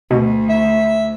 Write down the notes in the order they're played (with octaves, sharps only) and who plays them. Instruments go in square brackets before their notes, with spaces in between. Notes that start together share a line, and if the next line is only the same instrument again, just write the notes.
[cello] D2 [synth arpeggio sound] B2
[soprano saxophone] E5